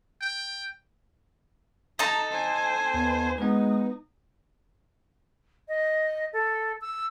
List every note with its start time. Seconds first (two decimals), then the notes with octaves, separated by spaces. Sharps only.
0.21 G5
1.99 D#4 A4 A5 A#5
2.32 C5 G#5
2.94 D#2 B3
3.38 G#3 B3 D#4 B4
5.68 D#5
6.33 A4
6.81 E6